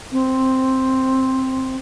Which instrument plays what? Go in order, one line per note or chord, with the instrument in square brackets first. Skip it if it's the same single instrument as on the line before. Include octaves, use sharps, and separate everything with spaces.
[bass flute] C4